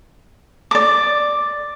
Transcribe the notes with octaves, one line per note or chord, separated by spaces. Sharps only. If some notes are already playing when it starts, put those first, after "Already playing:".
D5 D6